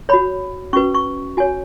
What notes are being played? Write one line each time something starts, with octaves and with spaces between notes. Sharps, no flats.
F#4 C#5 B5
C#4 F#4 B4 C#6
C#6
F#4 C#5 G#5